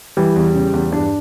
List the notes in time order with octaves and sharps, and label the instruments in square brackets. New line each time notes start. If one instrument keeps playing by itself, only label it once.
[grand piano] E3 G3
E2
C#3
E2
G2 D4